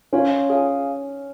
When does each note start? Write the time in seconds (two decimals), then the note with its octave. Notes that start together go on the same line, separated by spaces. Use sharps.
0.13 C#4 F4 C#5 F5
0.50 G#4 F5 G#5